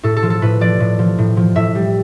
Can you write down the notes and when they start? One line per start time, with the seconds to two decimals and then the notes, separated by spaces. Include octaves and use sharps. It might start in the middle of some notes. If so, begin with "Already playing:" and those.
0.03 A2 A4
0.17 A4
0.23 F3
0.30 A4
0.42 A2 B4
0.61 F3 D5
0.80 A2
0.99 F3
1.18 A2
1.37 F3
1.56 A2 E5
1.75 G3